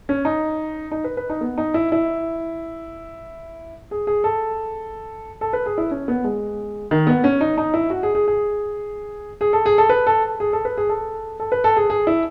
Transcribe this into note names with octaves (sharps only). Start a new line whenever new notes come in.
C#4
D#4
D#4
B4
B4
D#4
B3
D#4
E4
E4
G#4
G#4
A4
A4
B4
G#4
E4
C#4
B3
G#3
D#3
B3
C#4
D#4
D#4
E4
F#4
G#4
G#4
G#4
G#4
A4
G#4
A4
B4
A4
G#4
A4
B4
G#4
A4
A4
B4
A4
G#4
G#4
E4